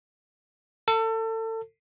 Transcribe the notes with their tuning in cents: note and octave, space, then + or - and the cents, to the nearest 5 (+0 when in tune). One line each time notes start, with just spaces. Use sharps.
A4 +30